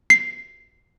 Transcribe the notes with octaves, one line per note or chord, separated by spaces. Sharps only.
C7